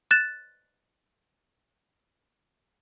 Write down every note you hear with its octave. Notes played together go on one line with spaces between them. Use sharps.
F#6 A6 E7